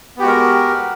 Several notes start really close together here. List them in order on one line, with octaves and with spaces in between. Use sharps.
B3 G4 F#4 G#3 A#4